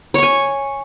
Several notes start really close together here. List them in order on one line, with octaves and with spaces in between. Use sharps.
C#5 C#6 G#5